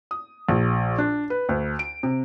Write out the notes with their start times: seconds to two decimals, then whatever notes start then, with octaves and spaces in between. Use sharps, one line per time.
0.11 D#6
0.49 A#1
0.98 D4
1.30 B4
1.49 D2
1.79 D7
2.03 C3